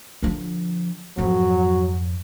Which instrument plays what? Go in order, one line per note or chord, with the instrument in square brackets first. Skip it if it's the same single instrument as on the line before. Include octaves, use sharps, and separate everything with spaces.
[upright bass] D3 F3
[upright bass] F2 G#2 [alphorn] F#3